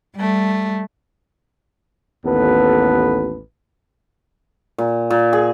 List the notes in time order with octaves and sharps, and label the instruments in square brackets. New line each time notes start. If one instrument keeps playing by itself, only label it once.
[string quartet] G3 A3
[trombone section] A1 D#2 B3 A4 B4
[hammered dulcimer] A#2
A#2
G#4